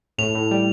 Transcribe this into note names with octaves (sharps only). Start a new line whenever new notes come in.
A2 F7
A2
G3